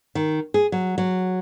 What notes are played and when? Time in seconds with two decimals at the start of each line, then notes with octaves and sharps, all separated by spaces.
0.15 D#3
0.54 G#4
0.72 F#3
0.98 F#3